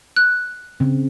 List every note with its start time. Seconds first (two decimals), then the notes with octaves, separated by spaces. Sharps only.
0.16 F#6
0.80 C#3 C4